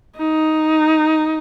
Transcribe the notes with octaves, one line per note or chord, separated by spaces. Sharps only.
D#4